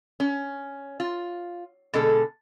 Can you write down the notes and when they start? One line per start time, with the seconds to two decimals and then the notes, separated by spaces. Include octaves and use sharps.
0.20 C#4
1.00 F4
1.94 B2 D3 G#3 A4